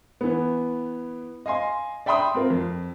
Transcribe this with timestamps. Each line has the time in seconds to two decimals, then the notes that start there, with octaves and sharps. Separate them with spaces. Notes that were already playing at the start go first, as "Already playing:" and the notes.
0.21 E3 B3
1.46 D#5 F5 G#5 C6
2.06 D5 E5 G5 B5 C6 D#6
2.35 C4 F4 A#4
2.50 F2